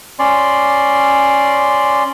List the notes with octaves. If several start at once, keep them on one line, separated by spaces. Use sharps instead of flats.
C#4 D5 C6